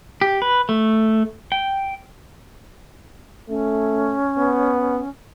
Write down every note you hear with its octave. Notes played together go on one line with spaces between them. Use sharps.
G4
B4
A3
G5
A3 C#4
B3